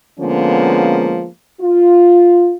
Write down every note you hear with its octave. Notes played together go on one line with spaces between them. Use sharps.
D3 F3 G#3 A#3 B3 C#4
F4